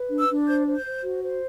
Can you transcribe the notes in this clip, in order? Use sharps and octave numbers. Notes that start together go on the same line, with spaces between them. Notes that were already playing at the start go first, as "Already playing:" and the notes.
Already playing: B4
D4
E6
D4
C5 G6
C5
G6
C5
F#4
C5